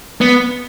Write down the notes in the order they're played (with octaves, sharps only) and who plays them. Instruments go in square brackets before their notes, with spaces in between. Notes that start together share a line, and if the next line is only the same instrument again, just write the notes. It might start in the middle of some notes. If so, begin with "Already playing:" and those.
[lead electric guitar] B3